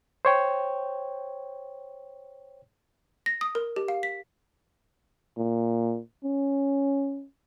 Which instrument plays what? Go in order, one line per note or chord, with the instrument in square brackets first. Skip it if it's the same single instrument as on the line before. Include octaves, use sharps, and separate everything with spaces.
[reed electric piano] C5 C#5 G5
[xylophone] A#6
D#6
A#4
G4
F5
B6
[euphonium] A#2
C#4